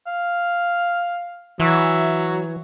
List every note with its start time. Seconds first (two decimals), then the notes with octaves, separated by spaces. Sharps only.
0.07 F5
1.60 E3 F#3 E5